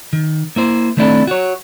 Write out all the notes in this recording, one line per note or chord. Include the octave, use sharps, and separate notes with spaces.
D#3
A#3 E4 C5
D#3 A3 C4 D4 E4 A4
F#4 C#5